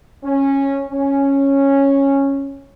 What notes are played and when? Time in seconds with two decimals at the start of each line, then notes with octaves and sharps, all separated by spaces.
0.24 C#4
0.90 C#4